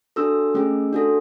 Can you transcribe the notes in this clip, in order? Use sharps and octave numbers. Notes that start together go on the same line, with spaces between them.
D4 F#4 A4 E6
A3 C#4 G#4
D4 F#4 A4